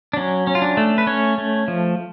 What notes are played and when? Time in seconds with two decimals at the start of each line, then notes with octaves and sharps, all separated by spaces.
0.13 D4
0.17 F#3 C#4
0.47 C#4
0.55 F4
0.62 D4
0.77 A3
0.98 B4
1.07 C#4 C#5
1.38 A3
1.68 F3